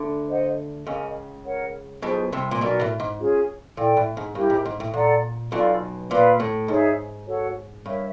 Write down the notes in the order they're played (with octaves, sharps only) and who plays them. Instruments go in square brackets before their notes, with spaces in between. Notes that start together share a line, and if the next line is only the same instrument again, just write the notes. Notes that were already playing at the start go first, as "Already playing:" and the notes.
Already playing: [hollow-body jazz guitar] D2 D3
[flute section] C5 D#5 F#5
[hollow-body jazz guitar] C#2 C#3 [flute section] A#4 D#5 G#5
[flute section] A#4 C#5 F#5
[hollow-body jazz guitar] B1 B2 [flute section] F4 G#4 C5
[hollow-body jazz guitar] C2 C3
A#2
[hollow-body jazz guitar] B1 B2 [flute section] F#4 A#4 D5
[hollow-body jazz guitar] A2
G#2
[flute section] C#4 F4 G#4 C#5
[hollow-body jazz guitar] A#2 [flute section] E4 A4 D5 G5
[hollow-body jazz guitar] A2
G#2
[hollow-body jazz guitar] G2 [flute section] E4 G4 A#4
[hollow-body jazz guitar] G#2
G#2
A2
[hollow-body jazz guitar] A#2 [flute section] A4 D5 F#5 A#5
[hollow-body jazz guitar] B1 B2 [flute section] F4 A4 D5 F5
[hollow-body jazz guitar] A#2 [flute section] B4 D5 F5
[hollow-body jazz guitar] A2
[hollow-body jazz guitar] G#2 [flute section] D#4 G#4 C#5 E5
[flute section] F#4 A4 C#5 F#5
[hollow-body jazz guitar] G2 [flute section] A#4 C#5 E5